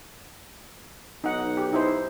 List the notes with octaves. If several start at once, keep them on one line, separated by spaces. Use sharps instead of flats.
B1 D#4 F#5
G4
D#4 E4 C5